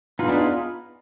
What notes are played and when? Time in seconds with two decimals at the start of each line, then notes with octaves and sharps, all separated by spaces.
0.19 B3 D#4 F4 G#4 B4
0.28 D4
0.37 F4